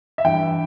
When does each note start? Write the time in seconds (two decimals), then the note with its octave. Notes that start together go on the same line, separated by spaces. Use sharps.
0.18 E5
0.25 G2 E3 G5